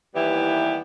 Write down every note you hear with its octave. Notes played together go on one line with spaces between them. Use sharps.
D#2 E3 G3 B3 E4 G4